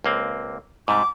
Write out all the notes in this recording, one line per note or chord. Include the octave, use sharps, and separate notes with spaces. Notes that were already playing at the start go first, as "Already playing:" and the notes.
C#2 A#3 C4
G#2 C3 G3 D6